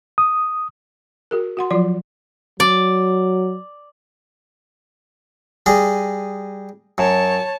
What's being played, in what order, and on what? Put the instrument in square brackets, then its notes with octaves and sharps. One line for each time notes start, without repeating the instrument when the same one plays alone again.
[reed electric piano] D#6
[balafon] F#4 G#4 A#4
F#4 F#5 C6
F3 F#3 F4 D5 C6
[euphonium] F#3 [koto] D5
[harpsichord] G3 G#4 D#5
[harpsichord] F#2 [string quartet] C#5 A5